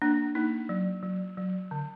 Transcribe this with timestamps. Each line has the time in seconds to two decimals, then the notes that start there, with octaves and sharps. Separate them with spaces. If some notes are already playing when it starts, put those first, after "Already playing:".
0.02 A#3 D4
0.35 A#3 D#4
0.69 F#3
1.03 F#3
1.38 F#3
1.71 D3